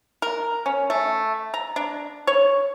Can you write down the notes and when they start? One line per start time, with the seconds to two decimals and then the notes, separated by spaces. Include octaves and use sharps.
0.22 A#4
0.66 C#4
0.90 A3
1.54 A#5
1.76 D4
2.27 C#5